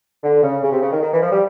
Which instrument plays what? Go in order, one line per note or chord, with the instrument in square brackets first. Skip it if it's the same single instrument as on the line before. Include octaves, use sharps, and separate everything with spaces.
[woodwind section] D3
C#3
C#3
C3
C#3
D#3
D#3
E3
F3
G3